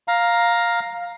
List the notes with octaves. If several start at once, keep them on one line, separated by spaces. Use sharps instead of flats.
F5 A#5